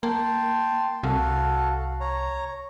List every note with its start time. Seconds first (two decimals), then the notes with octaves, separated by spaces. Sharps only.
0.03 A#3 G5 A5 C6
1.03 C2 F#4 A4 F5
2.01 C#5 A#5